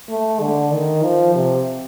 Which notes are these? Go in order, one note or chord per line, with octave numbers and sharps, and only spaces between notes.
A3
D3
D#3
F3
C3